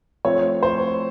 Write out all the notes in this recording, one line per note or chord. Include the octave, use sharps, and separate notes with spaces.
F3 A3 C4 C#5
C5